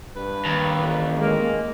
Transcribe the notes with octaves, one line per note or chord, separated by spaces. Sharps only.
G2 B4
D#2
A1
G#3 A#3